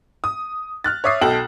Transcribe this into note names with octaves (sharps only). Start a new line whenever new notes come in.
D#6
F6 F#6 A6
C#5 E5 D6 D#6 C7
B1 A4 G5 A5 F#7